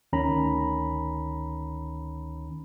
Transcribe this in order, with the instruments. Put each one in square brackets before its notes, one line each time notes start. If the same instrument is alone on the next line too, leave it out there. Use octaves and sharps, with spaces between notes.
[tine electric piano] D2 D#3 C#4 A#5 B5